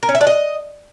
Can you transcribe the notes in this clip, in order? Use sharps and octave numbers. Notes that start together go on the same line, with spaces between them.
A#4
C#4
E5
D4
D#5